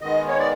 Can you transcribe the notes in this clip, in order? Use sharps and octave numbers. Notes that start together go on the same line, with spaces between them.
D#3 G#3 B3 D#5
C#5
D5